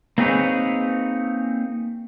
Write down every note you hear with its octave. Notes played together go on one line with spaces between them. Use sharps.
A#3 C4 D#4 G#4 B4 C#5